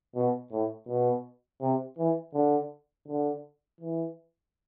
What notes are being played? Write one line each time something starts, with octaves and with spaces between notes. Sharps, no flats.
B2
A2
B2
C3
E3
D3
D3
E3